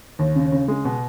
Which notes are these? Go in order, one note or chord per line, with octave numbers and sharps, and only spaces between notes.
D#2
C#3
C#3
G#3
B2